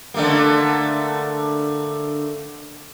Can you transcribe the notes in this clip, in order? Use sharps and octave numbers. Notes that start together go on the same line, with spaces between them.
D3 A3 A#3